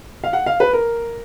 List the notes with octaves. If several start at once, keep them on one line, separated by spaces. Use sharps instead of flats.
F5
F#5
F5
B4
A#4